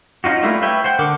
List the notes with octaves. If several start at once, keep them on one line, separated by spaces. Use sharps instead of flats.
C#4 D#4 F4 F#4
G3 A3 A#3 E4 F4
B4 C#5 E5 G5
C5 F#5 G5
D3 A#4 F#5 D6